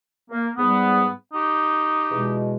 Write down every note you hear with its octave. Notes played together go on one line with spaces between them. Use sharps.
A#3
G#2 G3 B3
D#4 G4
E2 B2 G#3